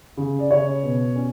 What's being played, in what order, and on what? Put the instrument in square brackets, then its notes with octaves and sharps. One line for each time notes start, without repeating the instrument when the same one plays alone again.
[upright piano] C#3
D5
C#3 C#5
B2
C#4